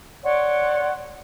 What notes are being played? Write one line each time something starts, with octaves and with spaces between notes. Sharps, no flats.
C#5 D5 F#5 C6